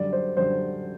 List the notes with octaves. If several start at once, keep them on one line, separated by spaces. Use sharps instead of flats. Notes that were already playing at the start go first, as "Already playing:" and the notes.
Already playing: F#2 D3 G3 D5
C5
F#2 D3 G3 C5